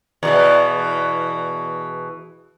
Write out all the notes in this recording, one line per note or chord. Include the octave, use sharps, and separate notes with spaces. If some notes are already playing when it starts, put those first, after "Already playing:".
E2 B2 E3